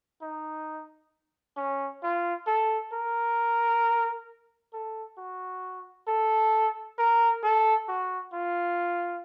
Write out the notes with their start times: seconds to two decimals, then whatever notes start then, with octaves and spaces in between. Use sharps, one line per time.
0.22 D#4
1.57 C#4
2.03 F4
2.47 A4
2.93 A#4
4.73 A4
5.18 F#4
6.08 A4
6.99 A#4
7.44 A4
7.88 F#4
8.33 F4